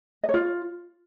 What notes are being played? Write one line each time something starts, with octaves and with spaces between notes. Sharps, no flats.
D#5
C#5
F4